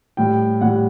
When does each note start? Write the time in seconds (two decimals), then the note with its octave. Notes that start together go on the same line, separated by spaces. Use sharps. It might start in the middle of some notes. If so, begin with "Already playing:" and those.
0.17 A2 G3 G5
0.61 A2 G3 F#5